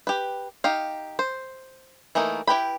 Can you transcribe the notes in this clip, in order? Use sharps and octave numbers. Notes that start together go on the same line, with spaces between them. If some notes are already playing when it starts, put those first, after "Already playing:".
G4 B4
D#4 G4 F5
C5
E3 A3 A#3 D#4
E4 G4 B4 G5 B5